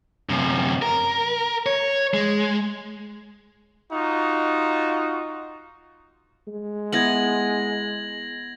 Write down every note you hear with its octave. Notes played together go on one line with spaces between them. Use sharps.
F#2 C3
A#4
C#5
G#3
D#4 F4 F#4
G#3
B3 E4 G#6 A#6 F#7